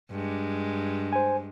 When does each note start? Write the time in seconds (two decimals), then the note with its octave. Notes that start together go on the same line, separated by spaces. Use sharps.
0.11 G2 G#3
1.13 C5 G#5